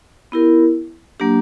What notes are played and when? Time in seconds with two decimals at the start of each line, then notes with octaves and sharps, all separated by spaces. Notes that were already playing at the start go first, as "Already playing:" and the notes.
0.32 B3 E4 G4 A#4
1.20 F#3 A#3 D4 G4